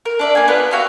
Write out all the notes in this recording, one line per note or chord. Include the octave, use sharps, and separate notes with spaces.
A#4
D4 D5 E5
A#3 G#5
B3 F4 B4
F#4 G4 E5 F5